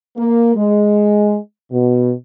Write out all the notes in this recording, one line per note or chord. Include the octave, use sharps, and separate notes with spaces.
A#3
G#3
B2